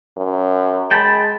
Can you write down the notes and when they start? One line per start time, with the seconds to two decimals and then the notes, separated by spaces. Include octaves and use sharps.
0.17 F#2
0.91 G#3 G5 A5 B5